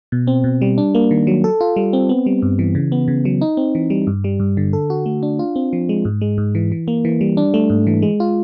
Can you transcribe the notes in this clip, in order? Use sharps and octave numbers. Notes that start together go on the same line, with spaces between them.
B2
C4
B2
G3
D4
A#3
D#3
F#3
A4
F4
G3
C4
B3
G3
G2
E3
C#3
B3
C#3
F#3
D#4
C4
E3
G3
G2
G3
G2
D3
A4
F#4
A3
D4
F4
C4
F3
G#3
G#2
G#3
G#2
E3
E3
A#3
E3
G3
D4
A3
G#2
E3
G#3
F4